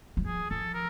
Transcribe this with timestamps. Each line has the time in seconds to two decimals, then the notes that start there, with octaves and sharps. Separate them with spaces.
0.17 F#3
0.25 F3 G#4
0.50 F3 A4
0.74 A#4